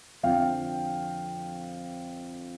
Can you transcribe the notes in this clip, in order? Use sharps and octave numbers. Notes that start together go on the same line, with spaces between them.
F2 D3 F3 F5 G5